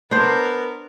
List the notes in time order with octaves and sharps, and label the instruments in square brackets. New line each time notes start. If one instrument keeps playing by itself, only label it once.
[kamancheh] B3 A#4 [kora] D4 C5